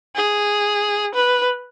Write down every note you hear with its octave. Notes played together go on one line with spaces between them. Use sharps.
G#4
B4